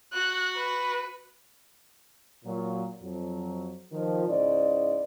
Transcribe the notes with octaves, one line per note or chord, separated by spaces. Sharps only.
F#4 F#6
B4
A#2 F#3
F2 F#3
D#3 F3
G#2 C#3 E4 C5 D5 D#5